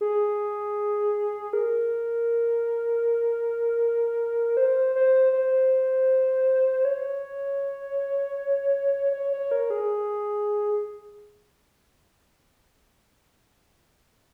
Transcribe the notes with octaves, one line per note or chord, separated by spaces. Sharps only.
G#4
A#4
C5
C5
C5
C#5
C#5
C#5
A#4
G#4